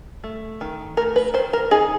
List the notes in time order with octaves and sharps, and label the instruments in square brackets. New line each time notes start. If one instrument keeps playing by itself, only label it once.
[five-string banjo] A3
D#3
A3 A#4
B4
D#3 C5
A#4
D#4 G#4